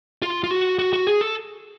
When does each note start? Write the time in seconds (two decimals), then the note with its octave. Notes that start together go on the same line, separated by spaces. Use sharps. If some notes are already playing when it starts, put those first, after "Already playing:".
0.22 F4
0.44 F4
0.51 F#4
0.79 F#4
0.93 F#4
1.07 G#4
1.21 A4